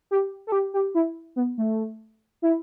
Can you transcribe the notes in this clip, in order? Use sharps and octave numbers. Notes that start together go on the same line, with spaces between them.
G4
A4
G4
G4
E4
B3
A3
E4